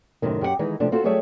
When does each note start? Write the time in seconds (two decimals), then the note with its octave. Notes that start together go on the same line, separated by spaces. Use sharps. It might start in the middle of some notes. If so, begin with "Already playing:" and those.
0.22 F#2 A2 C3 D#3
0.41 F#2 G4 G#4 F#5
0.59 D#3 E3 G#3 D#4
0.80 C3 F3 A3 D4
0.92 C4 F4 F#4 A4 C5
1.04 F#3 G3 A3 G#4 C#5 E5